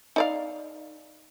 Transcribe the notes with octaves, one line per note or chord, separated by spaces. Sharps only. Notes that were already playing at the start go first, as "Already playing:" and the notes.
D#4 D5 F5